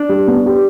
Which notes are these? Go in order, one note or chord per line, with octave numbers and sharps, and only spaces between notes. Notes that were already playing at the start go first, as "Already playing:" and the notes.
Already playing: D4
G3
B3
G4